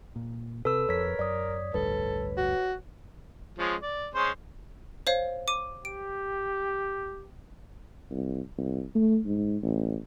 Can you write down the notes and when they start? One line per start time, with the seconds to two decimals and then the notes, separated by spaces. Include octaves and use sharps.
0.16 A#2
0.65 C3 A4 B4 E6
0.89 F2 A#4 C#5 B6
1.19 F#2 D5 D#6
1.74 A1 D2 G2 A4 B4
2.37 F#4
3.58 F3 G#3 C#4
3.81 D5
4.14 G#3 C#4 C5
5.07 C5 C#5 F5
5.48 D6 D#7
5.85 G4 D7
8.10 C2
8.58 C2
8.95 A3
9.25 G#2
9.63 A1